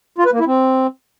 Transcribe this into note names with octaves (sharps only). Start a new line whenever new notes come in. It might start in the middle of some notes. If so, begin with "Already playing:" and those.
F4
B4
A#3
E4
C4